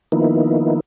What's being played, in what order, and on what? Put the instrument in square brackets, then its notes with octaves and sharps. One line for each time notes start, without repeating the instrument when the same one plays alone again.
[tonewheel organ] D#3 F3 A#3 B3 D#4 E4